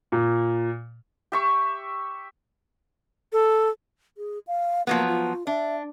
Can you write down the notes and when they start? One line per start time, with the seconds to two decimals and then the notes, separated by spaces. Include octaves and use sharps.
0.12 A#2
1.32 G4 E5 C#6
3.33 A4
4.17 G#4
4.47 F5
4.87 F3 F#3 A#3 B3
5.09 F4
5.47 D4 E5